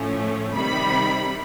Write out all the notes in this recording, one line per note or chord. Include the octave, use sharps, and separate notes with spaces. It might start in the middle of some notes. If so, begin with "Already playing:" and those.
Already playing: A2 F3 A3 C#4
C3 D#3 G3 B5